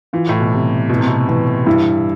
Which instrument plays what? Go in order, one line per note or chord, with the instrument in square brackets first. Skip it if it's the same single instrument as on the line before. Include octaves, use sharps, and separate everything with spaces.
[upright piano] E3 [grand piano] F4
[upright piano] A2
B2
[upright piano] C3 [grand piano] G3
[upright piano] B2 [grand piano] E3
[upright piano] C3
B2
[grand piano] E3
[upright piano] G2 [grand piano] E4